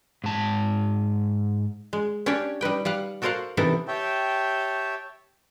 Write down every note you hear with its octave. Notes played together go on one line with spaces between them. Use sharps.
G#2 A5
G#3
C#4 D4 G4 C#5 D5
G3 D#4 B4 G5
G3 F5 F#5
F#4 A4 A#4 C5 F5 F#5
C3 E3 B3 D#4 A4 A#4
G4 C#5 E5 G5 A5